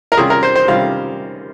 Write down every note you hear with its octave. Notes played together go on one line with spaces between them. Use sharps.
A#4
C3 G3 C#4 F4 G#4
A#4
C5
C5
C3 G3 C#4 F4 F5